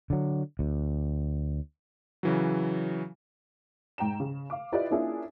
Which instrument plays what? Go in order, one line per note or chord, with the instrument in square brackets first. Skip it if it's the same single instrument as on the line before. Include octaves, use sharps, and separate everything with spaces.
[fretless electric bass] D3 F#3
D2
[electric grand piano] C#3 E3 F#3
[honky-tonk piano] G#2 G5 A#5 E7
C#3
F5 D6
E4 F4 G4 B4 D5 D#5
A#3 C#4 D4 E4 F4 G#4